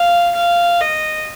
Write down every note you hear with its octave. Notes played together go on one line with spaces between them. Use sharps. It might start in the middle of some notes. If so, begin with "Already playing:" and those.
Already playing: F5
F5
D#5